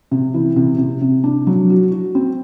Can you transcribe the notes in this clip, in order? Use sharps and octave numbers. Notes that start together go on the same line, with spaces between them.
C3
E3
C3
C3
C3
D4
F#3
F#4
F#4
C4